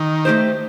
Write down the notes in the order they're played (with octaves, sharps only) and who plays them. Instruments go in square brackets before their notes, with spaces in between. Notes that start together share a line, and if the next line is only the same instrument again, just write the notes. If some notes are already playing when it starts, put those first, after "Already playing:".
Already playing: [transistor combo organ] D#3
[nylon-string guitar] A3 D#4 G4 C5